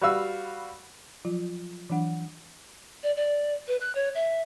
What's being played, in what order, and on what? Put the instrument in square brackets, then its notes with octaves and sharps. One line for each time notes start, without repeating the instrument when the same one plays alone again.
[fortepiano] G3 F#4 B4 F5 E6
[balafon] F3 F#3 F4
E3 F#3 D4 F#5
[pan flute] D5
D5
B4
F#6
C#5
E5